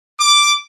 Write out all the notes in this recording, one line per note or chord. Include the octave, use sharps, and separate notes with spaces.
D6